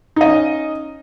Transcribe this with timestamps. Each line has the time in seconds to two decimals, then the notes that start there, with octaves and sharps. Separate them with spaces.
0.16 D#4
0.21 D#5
0.25 C#4